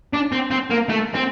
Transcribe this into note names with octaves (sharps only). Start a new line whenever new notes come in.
D4
C4
C4
A#3
A3
C4